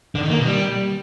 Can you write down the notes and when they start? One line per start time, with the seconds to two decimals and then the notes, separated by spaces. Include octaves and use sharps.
0.15 D3
0.23 D#3
0.30 A#3
0.37 B2
0.45 G3